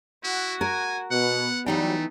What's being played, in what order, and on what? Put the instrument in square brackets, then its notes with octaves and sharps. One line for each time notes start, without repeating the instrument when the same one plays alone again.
[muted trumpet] E4 [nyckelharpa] F#4 F#5
[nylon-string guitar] A#4 [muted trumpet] G#5
[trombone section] B2 [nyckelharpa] B3 [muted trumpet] F#5
[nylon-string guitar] E3 D#4 G5 [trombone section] F#3 G3 [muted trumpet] A3